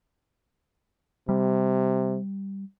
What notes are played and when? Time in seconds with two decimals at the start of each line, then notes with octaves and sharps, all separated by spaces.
1.29 C3 G3